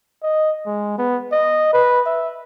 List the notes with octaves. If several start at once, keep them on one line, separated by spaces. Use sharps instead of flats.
D#5
G#3
B3
D#5
B4
E5